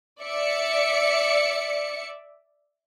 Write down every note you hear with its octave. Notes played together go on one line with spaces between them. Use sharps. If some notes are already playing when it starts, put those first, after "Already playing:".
D5 E5 C#7